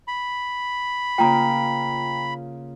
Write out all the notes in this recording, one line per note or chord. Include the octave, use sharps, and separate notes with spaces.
B5
C#3 A#3 F4 G5 A#5